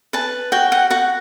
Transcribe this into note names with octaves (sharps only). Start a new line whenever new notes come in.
B4 A5
F#4 G5
F#5
F#4 F#5